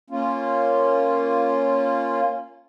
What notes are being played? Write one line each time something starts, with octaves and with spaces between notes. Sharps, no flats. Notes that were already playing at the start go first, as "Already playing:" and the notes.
A#3 C#4 F4